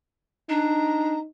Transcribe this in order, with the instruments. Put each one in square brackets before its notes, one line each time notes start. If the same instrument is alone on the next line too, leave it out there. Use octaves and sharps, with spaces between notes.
[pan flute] D4 [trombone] D#4 [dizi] A#5